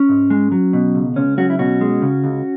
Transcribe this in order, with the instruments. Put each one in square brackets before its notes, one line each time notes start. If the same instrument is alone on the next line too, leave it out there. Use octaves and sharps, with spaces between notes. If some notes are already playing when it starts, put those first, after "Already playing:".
Already playing: [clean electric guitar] C#4
G#2
G#3
F#3
B2
C#2
C#2 C#4
F#3 C#4 F#4
E4
B2 C#4 F#4
G#3
C#3
C#2